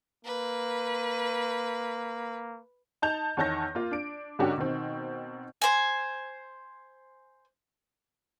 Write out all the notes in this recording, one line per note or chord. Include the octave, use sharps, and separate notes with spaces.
A#3 B4
D#4 A5 G6 F7
E2 D#3 C#5 A5 G6 A#6
A#3 F4
D4 D7
G#2 D3 C#4 D4 F#4 G4
B2 D#3 C4
C5 G#5